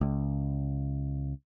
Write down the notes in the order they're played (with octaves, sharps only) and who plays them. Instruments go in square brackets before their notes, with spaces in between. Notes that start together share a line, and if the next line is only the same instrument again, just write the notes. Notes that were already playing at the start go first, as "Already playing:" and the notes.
[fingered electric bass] C#2